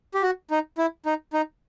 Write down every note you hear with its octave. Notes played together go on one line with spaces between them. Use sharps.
G4
F#4
D#4
E4
D#4
D#4